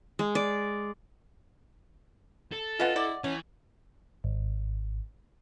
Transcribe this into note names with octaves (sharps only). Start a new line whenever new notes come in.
G#3
D5
A4
C#4 F4 B4 D#5 F#5
E4 D5
E3 A3 C#4
G#1